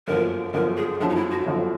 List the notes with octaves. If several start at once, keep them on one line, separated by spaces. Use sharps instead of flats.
G1 F#2 D3 F3 A#4
G1 F#2 D3 F3 A#4
G#4
G1 F#2 D3 F3 D4
D#4
E4
F#4
G1 F#2 D3 F3